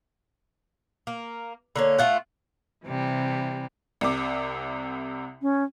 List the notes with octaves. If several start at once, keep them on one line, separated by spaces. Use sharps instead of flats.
A#3
D3 A#3 C#4
A3 F4 F#5
C3 E3 G3
C2 C3 D6
C#4